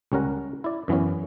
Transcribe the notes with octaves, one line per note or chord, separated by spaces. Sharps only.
C#2 G3 C#4 A#4 F#5
E4 D5
F#2 E3 B3 C#4